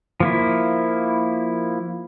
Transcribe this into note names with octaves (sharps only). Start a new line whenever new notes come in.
F3 A#3 E4